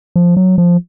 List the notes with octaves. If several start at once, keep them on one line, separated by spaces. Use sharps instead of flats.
F3
F#3
F3